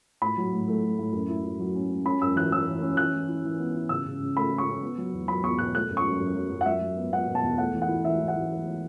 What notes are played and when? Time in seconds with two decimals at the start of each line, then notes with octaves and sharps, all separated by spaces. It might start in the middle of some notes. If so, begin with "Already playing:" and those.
0.22 A2 B5
0.37 F#3
0.53 A2
0.68 A3
0.82 A3
0.99 A2
1.13 F#2
1.29 E4
1.45 E4
1.59 F#3
1.75 C#4
1.91 C#4
2.05 C#4 B5
2.22 F#2 E6
2.36 E3 F#6
2.52 E3 E6
2.68 E3
2.82 C#4
2.97 E3 F#6
3.14 E3
3.28 E4
3.44 E3
3.59 B3
3.75 E4
3.89 C#3 E6
4.06 C#3
4.20 C#3
4.36 A3 B5
4.52 A3
4.58 C#6
4.66 C#3
4.82 B3
4.98 F#3
5.13 E2
5.28 F#3 B5
5.43 E2 C#6
5.59 B2 F#6
5.74 A3 F#6
5.90 F#2
5.97 C#6
6.05 F#2
6.20 F#2
6.36 F#3
6.51 F#2
6.61 F#5
6.66 F#3 E5
6.81 F#3
6.97 B3
7.12 B3 F#5
7.28 B2
7.35 A5
7.43 E2
7.58 A3 F#5
7.74 E3
7.82 F#5
7.89 E4
8.05 E3 E5
8.20 E3
8.28 F#5
8.36 E3